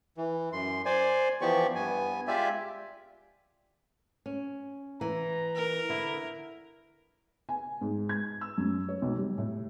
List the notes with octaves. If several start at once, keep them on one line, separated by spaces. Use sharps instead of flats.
E3
F#2 C6
C5 D5 G#5
E3 F3 B3 G4 D5 C#6
G2 B3 G#5
G#3 F4 G4 D5 E5 G#5
C#4
E3 A#5
A#4
D3 E4
G#5
G#2
G#6
E6
F#2
C#5
B1
G3
A2